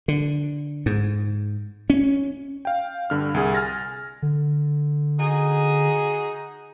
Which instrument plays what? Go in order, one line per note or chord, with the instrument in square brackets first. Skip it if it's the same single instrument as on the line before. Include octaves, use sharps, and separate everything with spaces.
[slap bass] D3
G#2
C#4
[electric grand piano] F5 G5
G2 D3 F6
C2 G#4
G#5 F6 A6 A#6
[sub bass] D3
[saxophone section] D#4 F#4 G#4